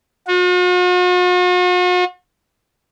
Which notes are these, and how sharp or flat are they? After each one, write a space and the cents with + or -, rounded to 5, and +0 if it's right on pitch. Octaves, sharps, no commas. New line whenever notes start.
F#4 -45